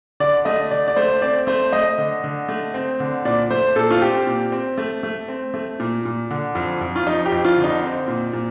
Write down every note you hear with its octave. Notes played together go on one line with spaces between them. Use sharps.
D3 D5
A3 D#5
D3 D5
D5
A3 C5
C4 D5
A3 C5
A3 D#5
D3
D3
A3
C4
D3
A#2 D5
A3 C5
A#2 A4
F4
C4 G4
A#2
C4
A3
A3
C4
A3
A#2
A#2
D3
F2
F2
F4
F3 D#4
G4
F2
F4
D3
D#4
C4
A#2
A#2